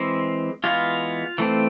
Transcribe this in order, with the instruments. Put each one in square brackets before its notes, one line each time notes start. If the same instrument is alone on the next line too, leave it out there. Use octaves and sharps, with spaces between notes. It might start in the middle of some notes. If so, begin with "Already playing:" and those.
Already playing: [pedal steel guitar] E3 G#3 C4
E3 G#3 B3 F4 F5
E3 A3 C4